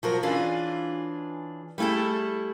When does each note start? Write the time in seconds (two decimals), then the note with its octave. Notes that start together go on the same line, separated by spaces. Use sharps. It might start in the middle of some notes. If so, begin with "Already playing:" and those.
0.03 F3 F#3 A#4
0.23 E3 C#4 D4 F4 G#4
1.78 G3 A3 E4 G#4 A4